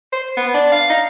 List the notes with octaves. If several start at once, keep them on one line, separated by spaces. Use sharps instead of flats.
C5
B3
D4
F5
D#4